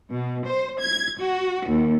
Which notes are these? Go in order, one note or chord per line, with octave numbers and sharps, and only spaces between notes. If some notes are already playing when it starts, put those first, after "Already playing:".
B2
C5
G#6
F#4
D#2